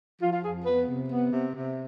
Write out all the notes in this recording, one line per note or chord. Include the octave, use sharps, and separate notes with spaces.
F3 F4
F4
F2 G#4
B3 B4
C3
B3
C3
C3